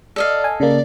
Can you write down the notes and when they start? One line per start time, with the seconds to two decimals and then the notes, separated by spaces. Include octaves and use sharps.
0.16 A4 D5 D#5 F5
0.44 G#5
0.60 C#3 A#3 D5